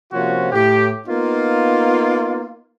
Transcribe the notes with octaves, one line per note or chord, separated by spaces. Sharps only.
C3 F3 A#3 C#4 F4 F#4
A2 G4
A#3 B3 D#4 F4